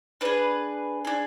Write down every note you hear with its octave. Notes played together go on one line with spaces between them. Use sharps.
D4 G#4 B4
D4 G#4